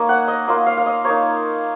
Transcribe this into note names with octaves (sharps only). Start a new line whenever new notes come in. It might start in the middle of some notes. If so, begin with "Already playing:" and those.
Already playing: A#3 D#4 A#4 C#5 D#5
F#5
D#5
A#3 F4 D#5
F5
F5
D#5
A#3 D#4 C#5